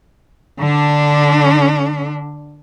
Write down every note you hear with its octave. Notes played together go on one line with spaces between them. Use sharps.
D3 D4